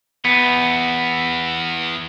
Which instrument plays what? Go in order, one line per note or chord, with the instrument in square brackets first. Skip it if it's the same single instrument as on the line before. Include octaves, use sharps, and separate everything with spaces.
[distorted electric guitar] E2 [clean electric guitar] B3